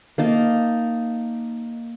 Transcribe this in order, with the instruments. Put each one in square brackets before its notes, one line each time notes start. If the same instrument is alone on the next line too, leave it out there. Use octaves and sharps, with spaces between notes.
[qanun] A#3 D#4 A5